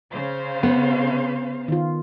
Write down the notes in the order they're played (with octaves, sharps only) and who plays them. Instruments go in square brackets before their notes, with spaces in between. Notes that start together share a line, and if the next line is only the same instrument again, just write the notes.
[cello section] C#3 C5 F5
[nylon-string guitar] B3
[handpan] D#3 F4